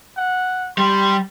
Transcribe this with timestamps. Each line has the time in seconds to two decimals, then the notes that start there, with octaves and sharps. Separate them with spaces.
0.17 F#5
0.78 G3 C6